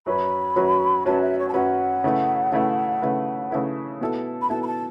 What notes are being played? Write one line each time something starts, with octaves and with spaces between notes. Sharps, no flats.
F#2 F#3 C#4 F#4 B4 B5
F#2 F#3 C#4 F#4 B4
F#2 F#3 C#4 F#4 B4 A5
E5
C#5
A5
F#2 F#3 C#4 F#4 B4 F#5
C#3 A3 E4 B4
C#3 A3 E4 B4
C#3 A3 E4 B4
C#3 A3 E4 B4
B2 B3 E4 A4
B5
B2 B3 E4 A4 A5
B5
A5